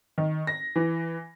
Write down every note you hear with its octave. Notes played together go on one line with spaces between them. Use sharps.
D#3
A#6
E3